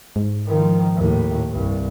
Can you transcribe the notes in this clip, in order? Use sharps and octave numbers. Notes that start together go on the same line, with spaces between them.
G#2
D#3 F3
D#2 A2
C2 G2